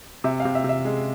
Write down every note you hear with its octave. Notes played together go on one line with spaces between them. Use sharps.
C3 E5
F5
C3
E5
C3
E5
G#3